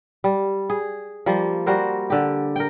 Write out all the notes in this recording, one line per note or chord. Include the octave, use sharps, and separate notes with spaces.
G3
G#4
F3 G3 A#3
G3 F#4 A#4 C5
D3 G4
A#4 G5